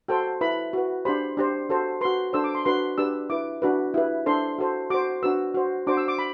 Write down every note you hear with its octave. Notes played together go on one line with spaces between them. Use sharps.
F#4 A4 C5 G5
E4 B4 B5
F#4 B4
D4 G4 C5 B5
D4 G4 C5
F#4 A4 C5
F#4 B4 C6
D4 A4 C5 E6
D6
C6
D4 F#4 B4 C6
D4 G4 B4 E6
E4 B4 D6
D4 F#4 B4
E4 G4 B4
D4 A4 C5 C6
F#4 A4 C5
F#4 C5 D6
D4 F#4 B4 E6
F#4 C5
D4 F#4 C5 D6
E6
D6
B5